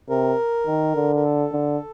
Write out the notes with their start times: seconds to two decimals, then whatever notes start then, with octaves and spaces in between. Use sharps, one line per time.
0.10 C3 A#4
0.66 D#3
0.96 D3
1.16 A#4
1.24 A4
1.52 D3